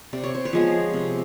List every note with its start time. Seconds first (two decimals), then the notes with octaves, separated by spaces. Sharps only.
0.13 C3 D5
0.24 C#5
0.35 C5
0.45 B4 C#5
0.53 F3 G#3 B3
0.93 C3